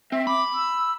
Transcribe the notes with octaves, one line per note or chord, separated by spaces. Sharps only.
C4 E5
B5 D6
E6